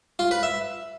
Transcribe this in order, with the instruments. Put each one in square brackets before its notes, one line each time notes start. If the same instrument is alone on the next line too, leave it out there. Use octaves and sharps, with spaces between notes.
[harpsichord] F4
B4
E5